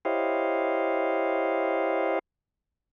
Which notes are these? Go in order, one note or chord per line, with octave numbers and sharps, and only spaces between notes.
E4 G4 C5 C#5 D#5 F5